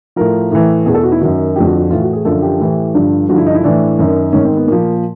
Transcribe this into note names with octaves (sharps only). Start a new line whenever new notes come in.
A2 F3 A#4
A2 E3
E2 B2 G#4
A4
F#4
E4
F#2 D#3 F#4
F2 D3 F3 G4
F#4
F#4
A2 E3 F4
F#4
G#4
F#2 D3 F3 A4
G4
A2 E3
G2 D3 F3
G2 D3 F3 F#4
E4
D#4
E4
A2 E3 D4
F#2 D#3
G#2 D#3 C#4
C4
B3
A#2 F3 A#3